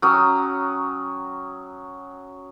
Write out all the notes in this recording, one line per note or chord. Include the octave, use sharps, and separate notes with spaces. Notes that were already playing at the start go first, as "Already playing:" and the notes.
F#3 C#4 G5 D#6